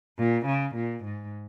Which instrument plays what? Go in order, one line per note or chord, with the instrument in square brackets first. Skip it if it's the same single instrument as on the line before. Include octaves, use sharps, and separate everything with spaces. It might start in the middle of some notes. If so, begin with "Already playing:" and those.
[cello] A#2
C#3
A#2
G#2